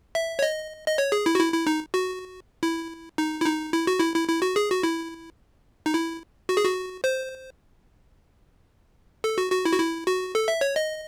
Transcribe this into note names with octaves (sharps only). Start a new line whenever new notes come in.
E5
C#5
D#5
D#5
C#5
G#4
E4
F#4
E4
E4
D#4
F#4
E4
D#4
E4
D#4
E4
F#4
E4
E4
E4
F#4
G#4
F#4
E4
D#4
E4
F#4
G#4
F#4
C5
A4
F#4
F#4
E4
F#4
E4
F#4
A4
E5
C#5
D#5